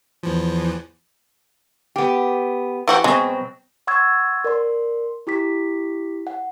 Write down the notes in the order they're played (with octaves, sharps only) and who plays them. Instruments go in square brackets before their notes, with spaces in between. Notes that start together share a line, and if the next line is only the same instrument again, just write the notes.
[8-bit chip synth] E2 E3 F3
[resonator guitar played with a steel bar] B3 G4
[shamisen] E3 F#4 G4
[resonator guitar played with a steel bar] B2 F#3 C4 [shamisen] G#3
[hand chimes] F#5 C6 C#6 E6 G#6 A6
A#4 D5 C6
E4 G4 D6 B6
F#5